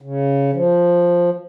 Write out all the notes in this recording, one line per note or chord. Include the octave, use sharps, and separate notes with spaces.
C#3
F3